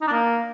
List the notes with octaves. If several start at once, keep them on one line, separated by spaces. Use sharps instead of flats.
D#4
D4
A#3